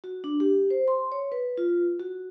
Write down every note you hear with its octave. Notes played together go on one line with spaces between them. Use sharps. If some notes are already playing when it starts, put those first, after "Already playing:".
F#4
D4
G4
C5
C6
C#5
B4
F4
F#4